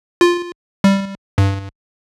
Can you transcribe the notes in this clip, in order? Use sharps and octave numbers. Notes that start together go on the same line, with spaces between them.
F4
G3
G2